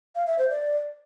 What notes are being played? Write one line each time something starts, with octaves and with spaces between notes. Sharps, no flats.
F5
E5
C5
D5